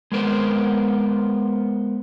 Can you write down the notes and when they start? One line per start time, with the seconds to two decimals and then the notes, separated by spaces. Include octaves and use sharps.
0.12 G#3 B3 A#4 C5